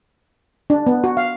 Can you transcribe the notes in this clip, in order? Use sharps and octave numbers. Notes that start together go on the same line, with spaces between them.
D4
B3
F#4
F5